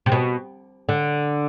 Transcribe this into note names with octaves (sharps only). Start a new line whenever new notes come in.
C3
B2
D3